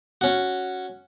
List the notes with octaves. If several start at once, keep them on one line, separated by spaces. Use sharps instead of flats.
C#4 F#4